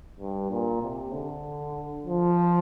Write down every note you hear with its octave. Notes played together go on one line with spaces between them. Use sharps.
G2
A#2
C3
D3
F3